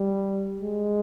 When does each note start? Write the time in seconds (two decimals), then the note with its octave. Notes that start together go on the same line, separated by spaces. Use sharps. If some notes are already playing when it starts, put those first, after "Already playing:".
Already playing: G3
0.60 G#3